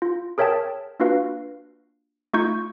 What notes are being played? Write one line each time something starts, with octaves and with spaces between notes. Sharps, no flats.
F4
G#4 A#4 C#5 E5 G5 A5
A#3 D4 F4 F#4 B4 F5
A3 D#4 F4 C#6 G6